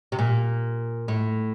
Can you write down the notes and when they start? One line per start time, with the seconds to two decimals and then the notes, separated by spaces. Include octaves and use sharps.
0.12 C3
0.19 A#2
1.08 A2